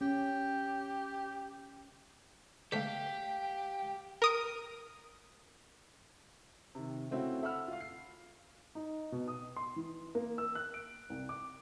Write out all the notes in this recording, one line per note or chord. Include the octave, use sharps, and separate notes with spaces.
C#4 G4
D3 A3 G4 F5 G5 B6
A#4 D#6 D7
C3 D#3
C#3 A3 C4 E4 F#4
A4 E5 F#5 B5 E6 F6
F4 F5
C7
D#4
B2
D#6
C6
E3
A#3
E6
F#6
D7
C2
D6